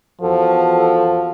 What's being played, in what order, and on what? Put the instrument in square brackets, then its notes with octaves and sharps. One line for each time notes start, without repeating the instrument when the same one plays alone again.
[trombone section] E2 F#4 A4 [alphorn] F3